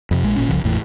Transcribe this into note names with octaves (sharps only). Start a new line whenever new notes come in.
F2 C3
A#1 G#3
G#1 A#2 C#4
F1 C2 C#3 F3
G#1 E2 A2 E3